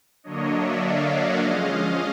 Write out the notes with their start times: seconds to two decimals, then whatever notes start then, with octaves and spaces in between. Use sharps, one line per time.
0.23 D3 F#3 A#3 D4 C#5 D#5
0.52 D5 E5
0.81 D#5 F5
1.10 E5 F#5
1.39 F3 G#3 C#4 D#5 F5